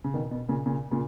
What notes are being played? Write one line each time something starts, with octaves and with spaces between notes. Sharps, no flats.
C#3
B2 D#3
B2
A#2 C#3
A#2 C#3
A#2 C#3